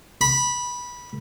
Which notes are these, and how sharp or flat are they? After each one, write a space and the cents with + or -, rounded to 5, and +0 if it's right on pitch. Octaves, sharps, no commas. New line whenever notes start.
B5 -15